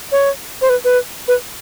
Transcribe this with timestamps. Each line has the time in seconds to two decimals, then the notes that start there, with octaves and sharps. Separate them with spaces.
0.12 C#5
0.61 C5
0.69 B4
0.84 B4
1.28 B4